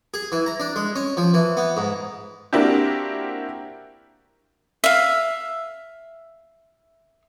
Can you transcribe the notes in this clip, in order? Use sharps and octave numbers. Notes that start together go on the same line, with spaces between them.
G#4
E3
A#5
D4
G#3
C#4
F3
E3
B3
G#2
A#3 C4 D4 E4 F#4 G4
E5 F5